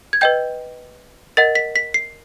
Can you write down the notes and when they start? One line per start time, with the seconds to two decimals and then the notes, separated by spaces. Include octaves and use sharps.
0.13 G#6
0.21 B4 D#5 G5 G6
1.37 A#4 D#5 F#5 A6
1.55 B6
1.76 B6
1.94 C7